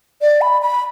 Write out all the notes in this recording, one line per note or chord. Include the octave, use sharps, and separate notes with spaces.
D5
B5
B5